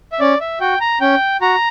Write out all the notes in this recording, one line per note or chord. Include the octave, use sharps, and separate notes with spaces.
E5
C#4 D5
E5
F#4 G5
A#5
C#4 G5
F#4 A#5